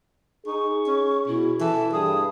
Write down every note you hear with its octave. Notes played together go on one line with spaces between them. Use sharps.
D#4 G#4 C#6
C#4
B2 E4
E3 A4 A5
G2 G#4 D#6